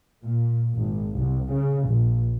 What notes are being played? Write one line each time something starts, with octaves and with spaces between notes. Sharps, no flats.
A#2
G#1
C2
C#3
A#1